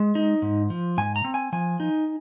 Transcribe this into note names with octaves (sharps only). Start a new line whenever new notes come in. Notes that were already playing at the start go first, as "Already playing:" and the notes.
Already playing: G#3
D#4
G#2
F3
G#2 G#5
A#5
C4
G#5
F3 G#5
D#4